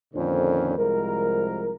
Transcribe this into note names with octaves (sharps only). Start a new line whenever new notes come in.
F2 A#2 D3 D#3 C#4 C5
C2 F3 G#3 A#4